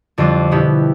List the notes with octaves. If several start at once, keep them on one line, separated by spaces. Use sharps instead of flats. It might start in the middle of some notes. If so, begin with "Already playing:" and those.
F2 D3 G3 D4 F4
B2 B3 E4 G4